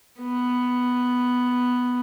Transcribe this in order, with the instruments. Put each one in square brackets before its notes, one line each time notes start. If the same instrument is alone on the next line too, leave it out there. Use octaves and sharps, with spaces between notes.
[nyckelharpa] B3